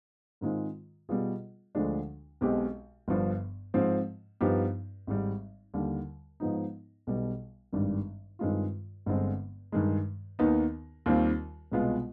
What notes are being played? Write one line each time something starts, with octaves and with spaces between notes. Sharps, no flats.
G#2 D#3 G#3 C4 F4
B2 G3 B3 F4 G#4
D2 D3 F3 G#3 D4
B1 B2 G#3 C4 G4
G1 G2 F3
G#2 F3 C4
G2 F3 B3 D#4 G4
G#1 G#2 G3
D#2 D3 G3
G#2 F3 B3 D#4
B1 B2 G3 B3
G#1 G2 D#3 G3 D4
G2 D#3 G#3 C4 F4
G1 G2 D3 G#3 C4
G2 D#3 G#3
D#2 D#3 B3 D#4
D#2 D#3 G3 C4 F4
C2 B2 G#3 B3 F4